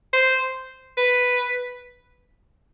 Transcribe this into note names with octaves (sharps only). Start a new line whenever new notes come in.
C5
B4